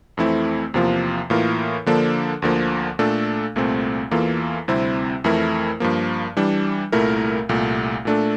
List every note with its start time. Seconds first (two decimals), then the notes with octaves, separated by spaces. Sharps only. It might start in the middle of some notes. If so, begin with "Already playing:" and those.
0.17 F2 E3 A3 C4 E4
0.74 E2 C3 F3 A#3 F4
1.30 A2 E3 A#3 F4 A#4
1.86 D3 F3 A#3 D4 A4
2.42 D2 D3 F3 A#3
2.99 A#2 A3 D4 A4
3.56 C2 A#2 A3 C4
4.11 E2 E3 A#3 F4 A4
4.68 D2 C3 G3 C4 E4
5.24 F2 E3 A3 E4 A#4
5.80 G2 F3 A#3
6.36 E3 G3 D4
6.92 C2 A#2 A3 E4 A#4
7.49 C2 A#2 A3
8.05 A#2 A3 D4 A4